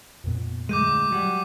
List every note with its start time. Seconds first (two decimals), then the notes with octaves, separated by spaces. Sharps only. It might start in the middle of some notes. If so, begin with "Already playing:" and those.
0.24 F2 A#2 B3
0.69 D2 G#2 G#3 D6 G6 D#7
1.11 F#3 G3 F#4